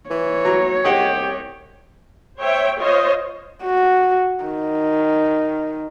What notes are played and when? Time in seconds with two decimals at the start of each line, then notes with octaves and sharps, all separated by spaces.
0.10 E3 C#5
0.45 F#3 A#5
0.84 C2 G4 G#4 D#5 F#5
2.38 C5 C#5 E5 G5
2.80 F4 C5 C#5 D#5
3.64 F#4
4.45 D#3